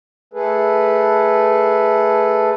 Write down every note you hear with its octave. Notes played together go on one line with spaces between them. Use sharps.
A3 G#4 A4 B4